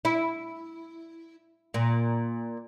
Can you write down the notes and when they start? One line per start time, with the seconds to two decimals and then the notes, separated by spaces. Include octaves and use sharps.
0.05 E4
1.74 A#2